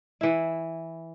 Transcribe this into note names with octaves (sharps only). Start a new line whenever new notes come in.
E3 E4